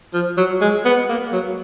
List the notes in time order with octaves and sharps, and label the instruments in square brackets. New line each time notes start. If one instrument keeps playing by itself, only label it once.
[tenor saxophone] F3
F#3
G#3
B3
A#3
F#3